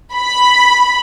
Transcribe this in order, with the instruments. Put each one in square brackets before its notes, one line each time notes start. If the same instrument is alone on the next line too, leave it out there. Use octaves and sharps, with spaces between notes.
[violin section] B5